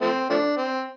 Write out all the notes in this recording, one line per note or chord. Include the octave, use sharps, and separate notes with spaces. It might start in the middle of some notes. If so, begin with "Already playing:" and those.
F3 A3 C4
F3 A3 D4
C4